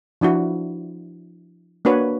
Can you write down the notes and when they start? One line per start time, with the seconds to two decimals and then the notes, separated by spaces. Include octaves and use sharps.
0.21 F3 D4 E4 F#4
1.85 A#3 D4 F#4 B4 C#5